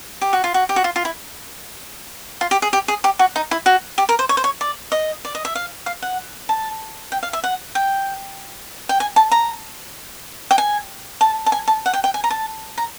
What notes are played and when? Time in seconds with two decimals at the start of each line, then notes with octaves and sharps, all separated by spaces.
0.21 G4
0.33 F#4
0.44 F4
0.54 F#4
0.69 G4
0.76 F#4
0.84 F4
0.96 F4
1.05 E4
2.41 F4
2.51 G4
2.62 G#4
2.73 G4
2.88 G#4
3.04 G4
3.19 F#4
3.36 D#4
3.51 E4
3.66 F#4
3.98 G4
4.09 A#4
4.19 C5
4.29 C#5
4.37 C5
4.44 C#5
4.61 D5
4.92 D#5
5.25 D5
5.35 D#5
5.45 E5
5.55 F5
5.86 F5
6.02 F#5
6.49 A5
7.12 G5
7.23 F5
7.33 E5
7.44 F#5
7.75 G5
8.89 G5
9.00 G#5
9.16 A5
9.32 A#5
10.51 G5
10.58 G#5
11.21 A5
11.46 A5
11.52 G#5
11.68 A5
11.86 F#5
11.93 G5
12.04 G5
12.14 G#5
12.24 A#5
12.30 A5
12.78 A#5